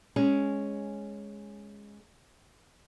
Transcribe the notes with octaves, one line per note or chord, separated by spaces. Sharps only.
G#3 C#4